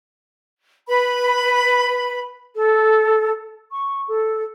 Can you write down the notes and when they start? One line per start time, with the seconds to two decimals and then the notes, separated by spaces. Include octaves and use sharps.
0.88 B4 B5
2.57 A4
3.71 C#6
4.09 A4